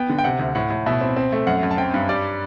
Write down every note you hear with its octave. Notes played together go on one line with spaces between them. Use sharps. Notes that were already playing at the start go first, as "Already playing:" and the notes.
Already playing: B3 G5
D3
G5
C3 F#5
D2
A2 F#5
A2
B2 E5
C4
C4
A3
F#2 F#5
F#2
A5
C4 G5
G2
G3 D5